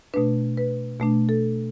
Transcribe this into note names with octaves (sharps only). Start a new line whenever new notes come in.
B2 A3 D4 B4
B4
B2 A3 D4
A4